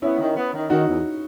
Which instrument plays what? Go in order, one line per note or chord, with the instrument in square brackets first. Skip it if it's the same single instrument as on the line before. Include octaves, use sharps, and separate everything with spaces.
[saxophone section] B3 [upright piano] C#4 E4
[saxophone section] D#3
B3
D#3
[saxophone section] D#3 [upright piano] D#4 F#4
[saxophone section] E2